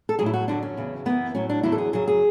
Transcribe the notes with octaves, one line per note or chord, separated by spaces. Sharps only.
A4
A2 F#3 G#4
E4
F#4
F#2 D3 F#3 D4
C#4
E2 C#3 F#3
F#2 E3 B3
A2 F#3 C#4
D4
E2 D3 F#3 E4
A4
G#4
F#2 C#3 F#3 G#4
G#4